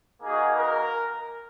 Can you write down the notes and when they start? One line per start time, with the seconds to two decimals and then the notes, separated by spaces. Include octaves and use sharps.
0.21 A#3 D#4 F#4 G#4
0.57 A#4